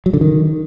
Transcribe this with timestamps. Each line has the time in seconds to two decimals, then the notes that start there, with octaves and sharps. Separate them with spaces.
0.06 F#3
0.14 D3
0.21 D#3